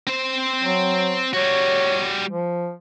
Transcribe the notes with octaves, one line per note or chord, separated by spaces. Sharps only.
C4 C5
F#3
G3 F#4 C#5
F3